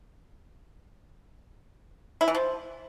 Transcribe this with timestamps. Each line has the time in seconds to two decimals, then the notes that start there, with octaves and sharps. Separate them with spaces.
2.21 E4
2.28 E3
2.35 F3